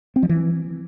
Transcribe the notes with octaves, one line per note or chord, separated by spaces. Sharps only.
C4
F3
E3